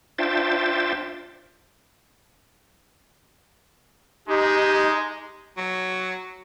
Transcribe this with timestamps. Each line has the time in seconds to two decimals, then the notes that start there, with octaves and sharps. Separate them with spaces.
0.18 D4 F4 C5 E5 G5 A6
4.28 G#3 D#4 G4
5.57 F#3